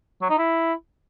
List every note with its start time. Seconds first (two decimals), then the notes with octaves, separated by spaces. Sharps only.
0.22 F#3
0.30 D#4
0.38 E4